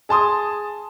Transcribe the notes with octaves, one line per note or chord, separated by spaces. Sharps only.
G#4 A5 C6 D#6